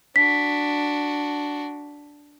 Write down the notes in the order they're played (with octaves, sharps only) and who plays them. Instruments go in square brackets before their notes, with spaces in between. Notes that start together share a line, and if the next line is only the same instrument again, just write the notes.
[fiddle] D4 F#4 [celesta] B6